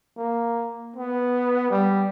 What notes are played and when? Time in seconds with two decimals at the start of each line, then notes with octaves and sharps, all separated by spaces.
0.17 A#3
0.96 B3
1.70 G3